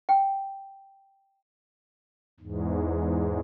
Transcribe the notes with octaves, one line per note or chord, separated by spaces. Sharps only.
G5
E2 G#2